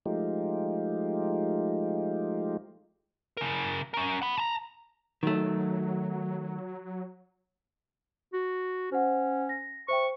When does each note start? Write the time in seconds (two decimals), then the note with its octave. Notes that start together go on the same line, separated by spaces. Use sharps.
0.06 F3 G#3 A3 D#4 F4 G4
3.37 C#3 A#4
3.94 C#4 A#4
4.22 F#5 B5
4.37 A5 A#5
5.23 D#3 F#3 A3
8.33 F#4
8.92 C#4 C5 F#5
9.49 A#6
9.88 C5 E5 G5 C#6